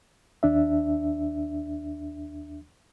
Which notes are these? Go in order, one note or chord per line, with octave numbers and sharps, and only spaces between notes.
D#2 D4 E5